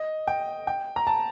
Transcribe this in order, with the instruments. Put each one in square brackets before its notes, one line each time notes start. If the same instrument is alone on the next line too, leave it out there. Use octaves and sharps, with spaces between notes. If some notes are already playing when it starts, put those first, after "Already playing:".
Already playing: [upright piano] D#5
G5
G5
A#5
A5